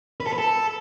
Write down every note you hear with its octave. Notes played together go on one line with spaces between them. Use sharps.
B4
A4
B4
A4